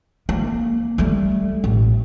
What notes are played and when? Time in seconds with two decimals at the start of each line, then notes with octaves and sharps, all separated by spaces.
0.29 A#3
0.98 G3 A3
1.64 A1